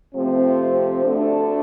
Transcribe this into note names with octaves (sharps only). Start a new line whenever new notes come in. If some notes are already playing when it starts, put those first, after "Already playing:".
C3 F3 A3 C4
D2 D3 A3 D4 A4